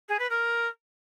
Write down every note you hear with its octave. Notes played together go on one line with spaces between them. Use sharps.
G#4
B4
A#4